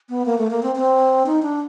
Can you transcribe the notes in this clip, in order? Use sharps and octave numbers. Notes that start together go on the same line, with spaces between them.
B3
A#3
A3
A#3
C4
C4
D#4
D4